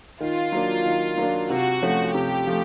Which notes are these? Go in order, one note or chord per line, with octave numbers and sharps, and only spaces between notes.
D#3 F4
F#3 A#3 D4
D#3
F#3 A#3 D4
C3 F#4
F3 A3 C#4
C3 G4
F3 A3